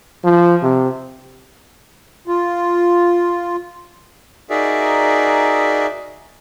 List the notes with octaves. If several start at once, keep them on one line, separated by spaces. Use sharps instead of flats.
F3
C3
F4
D#4 F#4 G#4 A#4 D5 E5